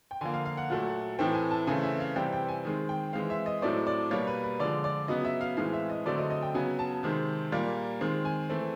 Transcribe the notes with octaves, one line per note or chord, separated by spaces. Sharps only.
G5
D3 F3 A#3 G#5
F5
F5
F#5
A#2 F#3 A3
A2 E3 A3 C4 G5
G#5
A5
C#3 E3 A3 C4 G#5
E5
F5
C3 E3 G3 C4 G5
G5
G#5
D#3 G#3 C4
G5
E3 G#3 C4 F5
E5
D#5
A2 F#3 A3 C4 D5
D5
B2 G3 A#3 C#5
B4
B4
D3 F3 G#3 D5
D5
C#3 F#3 B3 D#5
E5
F5
A2 E3 G#3 C4 F5
E5
D#5
D3 F#3 A3 C4 D5
D#5
D#5
G5
C#3 F#3 B3 G#5
A5
C3 D#3 G#3 C4
A#2 G3 A#3
D#3 G#3 C4
G#5
E3 A3 C4